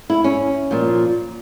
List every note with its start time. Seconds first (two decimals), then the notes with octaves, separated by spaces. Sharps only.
0.10 E4
0.24 C#4
0.71 A#2 F3